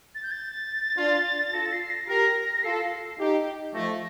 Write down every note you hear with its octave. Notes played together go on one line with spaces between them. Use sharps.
A6
G6
A6
D4 F4
F4 A4 A#6
C7
A#6
G4 A#4 A#6
F4 A4 C7
C7
D#4 G4
F3 A3 A#6